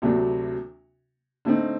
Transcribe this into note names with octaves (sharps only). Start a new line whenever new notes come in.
D2 C3 F#3 A3 D4
D3 A3 C4 D#4